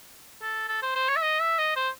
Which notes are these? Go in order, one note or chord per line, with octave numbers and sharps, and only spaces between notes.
A4
A4
C5
C5
C#5
E5
D#5
E5
D#5
C5